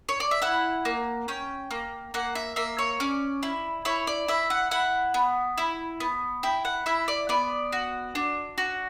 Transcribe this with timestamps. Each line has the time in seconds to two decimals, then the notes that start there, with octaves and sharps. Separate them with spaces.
0.09 C#5
0.20 D5
0.31 E5
0.42 E4 F#5
0.85 A#3
1.28 C#4 G5
1.71 A#3
2.14 A#3 F#5
2.35 E5
2.56 A#3 E5
2.79 C#5
3.00 C#4 D5
3.43 E4
3.85 E4 C#5
4.07 D5
4.28 E4 E5
4.50 F#5
4.71 E4 F#5
5.14 B3
5.58 E4
6.00 B3
6.43 E4 G5
6.65 F#5
6.86 E4 E5
7.08 D5
7.29 B3 D5
7.72 F#4
8.15 D4
8.58 F#4